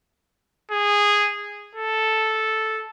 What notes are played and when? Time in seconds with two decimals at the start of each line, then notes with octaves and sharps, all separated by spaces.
0.71 G#4
1.76 A4